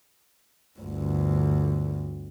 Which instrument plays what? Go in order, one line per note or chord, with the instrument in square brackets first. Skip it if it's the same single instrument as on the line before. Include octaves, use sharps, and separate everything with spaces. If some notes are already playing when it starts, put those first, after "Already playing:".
[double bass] G1 D2